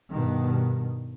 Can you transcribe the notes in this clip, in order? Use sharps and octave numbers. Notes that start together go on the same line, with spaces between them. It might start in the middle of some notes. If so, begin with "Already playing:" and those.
G2 B2 D#3